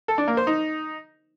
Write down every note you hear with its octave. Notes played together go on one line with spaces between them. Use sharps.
A4
D4
A#3
C5
D#4